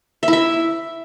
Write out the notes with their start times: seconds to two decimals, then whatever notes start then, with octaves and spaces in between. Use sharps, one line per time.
0.23 E5
0.28 E4
0.33 E5